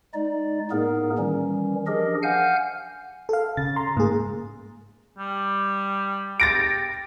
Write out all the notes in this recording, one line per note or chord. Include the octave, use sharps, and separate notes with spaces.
G#3 D#4 D5
A2 A#3 B3 D#4 G#4 A#4
D#3 E3 G3 C#4
F3 D4 G4 G#4 A#4 D#5
F5 F#5 G#5 F6 G6
A4 F5
C#3 A6
A#5 C6
G#2 A#3 G#4
G3
G4 A6 A#6 D7